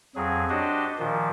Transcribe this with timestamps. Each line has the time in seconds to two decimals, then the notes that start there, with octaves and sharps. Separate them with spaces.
0.16 F2 F#3 G#4
0.49 D4 F#4 G4 C5 D#5
0.99 A#2 D#3 F3